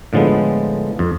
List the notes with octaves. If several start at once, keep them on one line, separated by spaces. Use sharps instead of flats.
A2 D3 F3 G#3 B3
F2